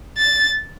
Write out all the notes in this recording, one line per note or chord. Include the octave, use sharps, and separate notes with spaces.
A6